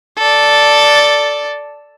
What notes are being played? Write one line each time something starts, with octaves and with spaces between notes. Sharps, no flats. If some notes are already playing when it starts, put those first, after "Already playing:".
A4 D5